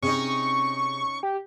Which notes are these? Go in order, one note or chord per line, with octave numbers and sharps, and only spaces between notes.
C3 C#4 D#4 G#4 C#6
G4